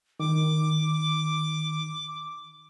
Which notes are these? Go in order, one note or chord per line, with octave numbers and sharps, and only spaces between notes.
D#3 D6